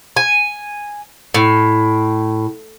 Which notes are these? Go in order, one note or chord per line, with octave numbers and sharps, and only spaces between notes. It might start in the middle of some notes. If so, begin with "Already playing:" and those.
G#5
A2